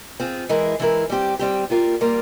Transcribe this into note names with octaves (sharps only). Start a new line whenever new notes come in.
C4 F4 G#4
E3 G#3 E4 A#4
E3 G#3 E4 A#4
G3 C4 G4
G3 C4 G4
G3 A#3 F4 A#4 F5
G3 A#3 F4 A#4 F5